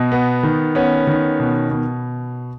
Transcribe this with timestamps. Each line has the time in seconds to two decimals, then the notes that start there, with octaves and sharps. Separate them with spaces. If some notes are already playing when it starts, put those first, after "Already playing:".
Already playing: B2 D#5
0.12 B3
0.43 D#3
0.75 B3 C#4
1.07 D#3
1.40 B2
1.71 B2